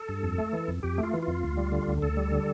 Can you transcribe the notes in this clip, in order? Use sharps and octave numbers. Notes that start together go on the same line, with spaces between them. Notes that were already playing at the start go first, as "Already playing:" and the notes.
Already playing: A4
G2
F2
A3
E3
F2
F2 G4
A3
F4
E3
F4
F2
D2
G3
D3
D2
D2 A4
G3
D3